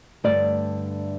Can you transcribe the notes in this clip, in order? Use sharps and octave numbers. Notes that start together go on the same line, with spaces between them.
G2 D3 A3 D5